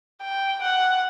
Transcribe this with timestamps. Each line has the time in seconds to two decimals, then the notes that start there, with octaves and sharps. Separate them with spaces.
0.22 G5
0.63 F#5